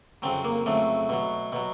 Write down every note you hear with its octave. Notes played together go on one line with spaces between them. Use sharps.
F2 C#3 F#3 C4
A#3
F2 C#3 F#3 A3
B2 F#3
B2 F#3